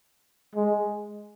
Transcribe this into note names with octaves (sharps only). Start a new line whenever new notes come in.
G#3